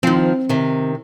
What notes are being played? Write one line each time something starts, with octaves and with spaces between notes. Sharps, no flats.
D#3 F3 C4
C3 D#3